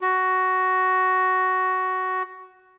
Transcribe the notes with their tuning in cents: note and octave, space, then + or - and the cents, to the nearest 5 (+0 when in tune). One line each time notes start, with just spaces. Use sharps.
F#4 +10